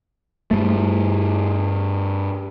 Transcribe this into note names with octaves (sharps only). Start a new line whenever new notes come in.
G2 A3